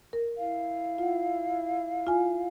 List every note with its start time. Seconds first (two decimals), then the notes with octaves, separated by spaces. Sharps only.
0.13 A#4
0.37 E4 F5
0.98 F4 F#5
2.07 F4 G#5